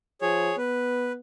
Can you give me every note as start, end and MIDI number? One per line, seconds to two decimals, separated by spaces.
0.21 0.51 53
0.21 0.56 68
0.21 0.56 73
0.58 1.19 59
0.58 1.12 71